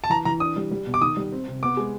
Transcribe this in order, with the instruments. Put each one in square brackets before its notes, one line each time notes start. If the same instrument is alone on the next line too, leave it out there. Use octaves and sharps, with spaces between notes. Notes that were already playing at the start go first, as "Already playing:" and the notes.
[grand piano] A5
[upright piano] E3 [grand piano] A#5
[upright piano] E3 [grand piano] A#5
[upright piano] D4 [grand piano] D#6
[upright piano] G3
G3
B2
[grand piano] D6
[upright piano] D#3 [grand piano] D#6
[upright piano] G3
C4
C3
[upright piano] B3 [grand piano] D6
[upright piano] G#3